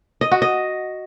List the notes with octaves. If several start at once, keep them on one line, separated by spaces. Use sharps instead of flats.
D#5
F#4
D#5